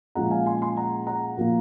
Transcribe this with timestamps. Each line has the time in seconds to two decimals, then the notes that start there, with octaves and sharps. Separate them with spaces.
0.15 A#2 F3 G#3 C#4 F4 F#5 A#5
0.31 F5 G#5
0.46 G#5 C6
0.62 G#5 C6
0.77 F#5 A#5
1.07 F#5 A#5
1.37 A#2 F3 A#3 F4